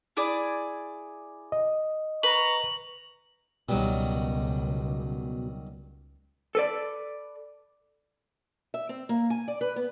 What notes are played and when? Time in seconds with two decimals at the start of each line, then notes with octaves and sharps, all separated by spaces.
0.17 E4 G#4 D5
1.52 D#5
2.23 B4 A#5 C#6 F#7
3.69 C#2 B2 D#3 F#3 G3
6.55 A4 B4 D5
8.74 E5
8.89 C4
9.09 A#3
9.30 G#5
9.48 D5
9.61 B4
9.76 B3